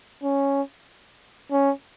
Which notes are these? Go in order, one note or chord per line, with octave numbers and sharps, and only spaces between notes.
C#4
C#4